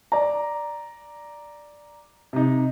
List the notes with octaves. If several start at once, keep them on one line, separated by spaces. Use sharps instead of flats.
D5 A#5
C3 D#4